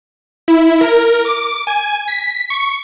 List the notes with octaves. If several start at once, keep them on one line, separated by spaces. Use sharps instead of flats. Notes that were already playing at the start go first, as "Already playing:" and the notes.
E4
A#4
D6
G#5
B6
C#6